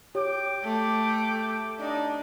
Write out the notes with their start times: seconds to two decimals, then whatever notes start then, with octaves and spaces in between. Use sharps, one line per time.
0.15 G4 C#5 G5 D6
0.64 A3
1.79 D4 D#4